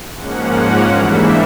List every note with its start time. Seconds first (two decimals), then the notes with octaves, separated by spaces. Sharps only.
0.16 G#2 F3 A#3 C#4 F#5
0.91 G#2 E3 G3 A#3 D4 E5